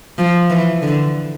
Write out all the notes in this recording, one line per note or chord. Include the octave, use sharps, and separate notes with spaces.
F3
E3
D3